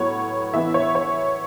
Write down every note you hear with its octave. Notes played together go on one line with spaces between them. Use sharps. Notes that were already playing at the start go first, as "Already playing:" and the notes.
Already playing: A2 F#3 B3 C#5
E3 B3 E5
C#5
C#5